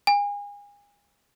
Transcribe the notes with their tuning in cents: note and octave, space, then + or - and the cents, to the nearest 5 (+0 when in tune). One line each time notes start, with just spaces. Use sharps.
G#5 -35